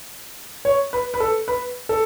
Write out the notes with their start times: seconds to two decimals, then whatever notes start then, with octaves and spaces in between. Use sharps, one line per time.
0.65 C#5
0.93 B4
1.14 B4
1.20 A4
1.48 B4
1.89 A4